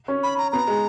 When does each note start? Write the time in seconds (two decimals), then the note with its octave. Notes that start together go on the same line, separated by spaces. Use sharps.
0.08 C#4
0.23 B5
0.38 A#5
0.52 B3 A#5
0.67 G#3